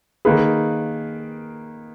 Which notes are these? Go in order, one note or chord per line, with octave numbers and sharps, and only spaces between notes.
D#3 A#3 D#4 G#4 B4